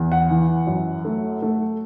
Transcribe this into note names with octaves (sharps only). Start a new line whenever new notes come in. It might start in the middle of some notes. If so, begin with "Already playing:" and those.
Already playing: E2
F#5
E3
F#2
A3
A3